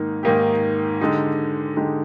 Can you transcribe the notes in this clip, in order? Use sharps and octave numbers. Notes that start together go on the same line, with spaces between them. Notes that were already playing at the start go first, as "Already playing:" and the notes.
Already playing: G#2 D#3 A#3 D#4
G#2 D#3 A#3 D#4 G4
D3 G#3 D#4 G4
D3 G#3 D#4 G4